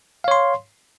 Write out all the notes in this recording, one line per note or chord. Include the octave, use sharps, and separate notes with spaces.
C#5 F5 C6